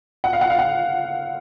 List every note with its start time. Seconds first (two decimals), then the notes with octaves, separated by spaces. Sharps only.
0.24 F#5
0.33 F5
0.41 F#5
0.50 F5
0.59 F#5